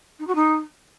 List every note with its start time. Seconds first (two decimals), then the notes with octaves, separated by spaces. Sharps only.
0.19 D#4
0.27 F#4
0.35 D#4